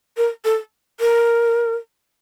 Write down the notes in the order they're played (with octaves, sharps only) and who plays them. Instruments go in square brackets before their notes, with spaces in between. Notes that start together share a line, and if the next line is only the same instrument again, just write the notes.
[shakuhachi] A#4
A4
A#4